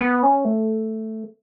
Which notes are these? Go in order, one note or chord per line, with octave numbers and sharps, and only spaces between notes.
B3
C#4
A3